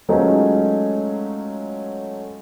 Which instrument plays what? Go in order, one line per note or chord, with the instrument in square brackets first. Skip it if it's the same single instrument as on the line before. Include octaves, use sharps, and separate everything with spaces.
[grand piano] F#3 G#3 A3 C#4 D#4 F4